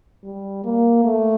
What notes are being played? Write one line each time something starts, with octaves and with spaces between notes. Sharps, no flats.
G3
A#3
A3